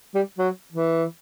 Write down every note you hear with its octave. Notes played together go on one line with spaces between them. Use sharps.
G3
F#3
E3